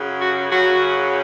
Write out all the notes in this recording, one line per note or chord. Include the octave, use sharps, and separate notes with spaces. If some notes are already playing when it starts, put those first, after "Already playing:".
Already playing: F#2 C#3 F#3
F#4
F#2 C#3 F#3 F#4